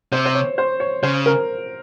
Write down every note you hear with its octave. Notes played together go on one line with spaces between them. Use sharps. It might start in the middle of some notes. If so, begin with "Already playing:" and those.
C3 C5
C5
C#5
C5
C#5
C#3 C5
A#4